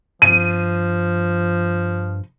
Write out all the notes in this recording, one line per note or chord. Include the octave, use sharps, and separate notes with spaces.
G2 F3 D#7